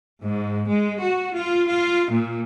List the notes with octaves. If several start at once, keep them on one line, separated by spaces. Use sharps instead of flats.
G#2
G#3
F#4
F4
F4
A#2